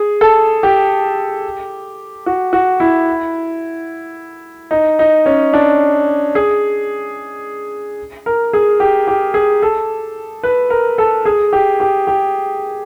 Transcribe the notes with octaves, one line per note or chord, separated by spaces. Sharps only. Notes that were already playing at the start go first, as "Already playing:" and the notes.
Already playing: G#4
A4
G4
F#4
F#4
E4
D#4
D#4
C#4
D4
G#4
A#4
G#4
G4
G4
G#4
A4
B4
A#4
A4
G#4
G4
G4
G4